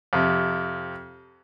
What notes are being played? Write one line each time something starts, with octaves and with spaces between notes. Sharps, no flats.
F2 C3